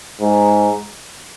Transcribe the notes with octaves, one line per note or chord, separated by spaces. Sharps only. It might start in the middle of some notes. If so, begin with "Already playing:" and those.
G#2